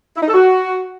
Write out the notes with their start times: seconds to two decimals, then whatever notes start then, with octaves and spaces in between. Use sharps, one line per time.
0.16 E4
0.22 D#4
0.28 A4
0.34 F#4